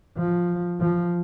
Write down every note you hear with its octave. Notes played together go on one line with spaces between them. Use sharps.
F3
F3